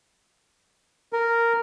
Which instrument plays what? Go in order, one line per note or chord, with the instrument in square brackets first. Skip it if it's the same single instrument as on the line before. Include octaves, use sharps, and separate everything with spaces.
[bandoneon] A#4